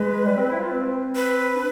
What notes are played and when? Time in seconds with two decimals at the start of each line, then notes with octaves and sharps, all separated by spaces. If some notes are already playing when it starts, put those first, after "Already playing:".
Already playing: G#3 B4
0.26 G3
0.36 C4
0.48 E4
0.59 F4
0.70 C4
1.15 B4
1.55 D4